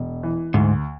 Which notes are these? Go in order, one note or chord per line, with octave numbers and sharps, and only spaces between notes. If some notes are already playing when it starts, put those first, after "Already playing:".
Already playing: E1
E3
D2 G#2